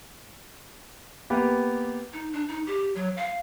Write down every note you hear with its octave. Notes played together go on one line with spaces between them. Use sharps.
A#3 B3 G4
D#4
D4
D#4
G4
F#3
F5